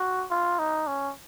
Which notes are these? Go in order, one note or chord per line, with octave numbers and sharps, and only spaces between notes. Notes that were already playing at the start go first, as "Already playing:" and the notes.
Already playing: F#4
F4
D#4
C#4